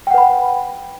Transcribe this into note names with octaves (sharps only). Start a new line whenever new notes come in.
B4 F#5 G5 B5